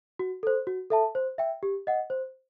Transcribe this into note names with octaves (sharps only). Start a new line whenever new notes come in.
F#4
A4 C5
F#4
A4 E5 A5
C5
E5 G5
G4
D#5 F#5
C5